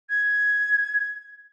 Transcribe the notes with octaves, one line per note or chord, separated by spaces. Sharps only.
G#6